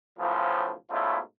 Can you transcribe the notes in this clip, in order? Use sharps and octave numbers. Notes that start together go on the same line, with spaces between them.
B1 A2 C#3 F3
G#2 B2 A3 C#4 E4 F4